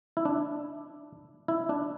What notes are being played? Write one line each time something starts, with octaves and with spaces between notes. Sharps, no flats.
E4
D4
E4
D4